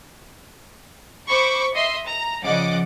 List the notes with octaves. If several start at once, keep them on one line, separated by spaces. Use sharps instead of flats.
C5 B5 C#6 D6
D#5 E5 C6
A#5
C#3 F3 D5 D#5 F#5 D6